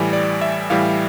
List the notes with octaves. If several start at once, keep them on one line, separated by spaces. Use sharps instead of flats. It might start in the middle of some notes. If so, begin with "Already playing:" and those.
Already playing: A2 E3 G3 G#5
D5
E5
A2 E3 G3 F5